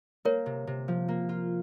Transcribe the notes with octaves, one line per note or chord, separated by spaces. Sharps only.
A#3 A#4 C#5
C3
C3
F3
A#3
F4